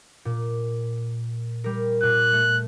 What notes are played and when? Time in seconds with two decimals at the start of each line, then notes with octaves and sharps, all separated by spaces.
0.25 A#2
1.64 G3 A#4
2.03 A#2 F#6
2.33 A3